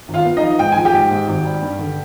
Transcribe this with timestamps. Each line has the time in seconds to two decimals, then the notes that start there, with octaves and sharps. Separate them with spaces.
0.08 G#1
0.14 F4 F5
0.25 B3
0.37 D#4 D#5
0.43 F3
0.59 G#2 G5
0.72 F3 G#5
0.85 G4 G5
0.94 G#2
1.11 G#2
1.28 G#1
1.45 G3
1.62 G2
1.79 D3